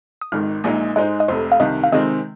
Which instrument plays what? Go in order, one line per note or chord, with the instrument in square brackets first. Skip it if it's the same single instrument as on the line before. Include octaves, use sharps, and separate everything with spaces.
[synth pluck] D#6
[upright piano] G#1 G#2 D#3 [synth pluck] F6
[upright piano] A#1 A#2 G#3 D#4 [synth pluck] D#6
[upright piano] G#2 G#3 D#4 C5 [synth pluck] D#5
[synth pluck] D#5
[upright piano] F1 F2 C3 [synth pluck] C5
[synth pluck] F5
[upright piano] C2 C3 D#3 [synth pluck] D#5
[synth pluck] F5
[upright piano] C3 D#3 G#3 C4 [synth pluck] D#5